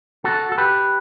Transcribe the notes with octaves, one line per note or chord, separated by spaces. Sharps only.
F#4 A4
A4
G4 B4